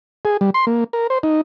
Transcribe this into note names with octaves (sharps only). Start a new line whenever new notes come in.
G#4
G3
C6
A#3
A#4
C5
D#4